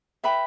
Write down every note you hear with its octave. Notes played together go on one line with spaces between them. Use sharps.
B4 E5 G5 B5